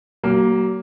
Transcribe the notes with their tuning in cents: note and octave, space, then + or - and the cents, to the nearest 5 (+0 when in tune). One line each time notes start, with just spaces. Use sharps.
F#3 +40 A#3 +0